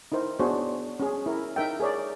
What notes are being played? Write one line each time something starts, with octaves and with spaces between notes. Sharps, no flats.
D#4 E4 A#4 C5
B3 D4 F#4 G#4 C5 C#5
C#4 G#4
E4 A#4
D#4 A#4 E5 G5
G#4 A#4 C#5 D5